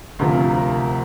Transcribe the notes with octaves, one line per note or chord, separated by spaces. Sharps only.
D2 C3 F3 A#4
A#4